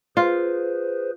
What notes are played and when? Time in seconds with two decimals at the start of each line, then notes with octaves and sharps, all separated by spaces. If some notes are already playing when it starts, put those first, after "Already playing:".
0.17 F4 G#4 B4 C5